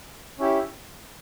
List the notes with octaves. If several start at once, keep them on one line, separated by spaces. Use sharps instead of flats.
C#4 E4 G4